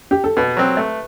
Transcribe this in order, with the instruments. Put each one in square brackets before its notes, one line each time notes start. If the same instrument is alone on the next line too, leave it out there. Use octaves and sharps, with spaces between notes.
[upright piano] G4
A4
[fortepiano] B2 [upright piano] B4
[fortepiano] F#3 C4
A3